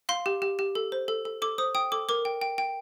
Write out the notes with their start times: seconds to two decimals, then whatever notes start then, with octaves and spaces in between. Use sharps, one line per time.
0.09 F5 C6
0.26 G4
0.42 G4
0.59 G4
0.75 A4
0.92 C5
1.08 A4
1.25 A4
1.42 A4 D6
1.58 C5 D#6
1.75 G5 D#6
1.92 A4 D6
2.09 A#4 D6
2.25 G5
2.42 G5
2.58 G5